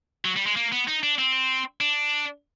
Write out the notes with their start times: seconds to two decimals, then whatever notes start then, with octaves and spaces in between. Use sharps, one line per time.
0.25 F#3
0.36 G3
0.46 G#3
0.56 A#3
0.72 B3
0.88 D#4
1.03 D4
1.18 C4
1.81 D4